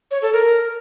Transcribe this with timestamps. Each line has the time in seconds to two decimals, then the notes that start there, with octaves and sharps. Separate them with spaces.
0.11 C#5
0.22 A4
0.33 A#4